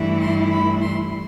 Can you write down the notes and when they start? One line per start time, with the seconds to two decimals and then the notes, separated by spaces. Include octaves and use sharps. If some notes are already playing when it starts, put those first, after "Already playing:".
Already playing: G2 E3 A3 E4
0.21 C6
0.52 B5
0.81 C6